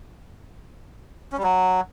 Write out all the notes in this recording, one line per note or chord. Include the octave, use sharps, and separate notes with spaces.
C#4
G3
F#3